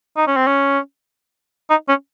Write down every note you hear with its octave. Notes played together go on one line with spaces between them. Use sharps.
D#4
C#4
C4
C#4
D#4
C#4